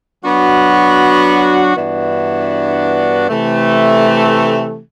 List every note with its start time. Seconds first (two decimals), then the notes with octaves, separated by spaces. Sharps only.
0.23 F#3 B3 D4 F#4
1.76 G2 E3 B3 D4 F#4
3.29 C3 E3 A3